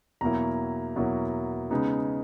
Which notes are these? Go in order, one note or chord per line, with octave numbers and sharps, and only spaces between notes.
E2 B2 F#3 A#3 E4 A#5
E2 B2 F#3 A#3 E4
C#3 G#3 B3 D#4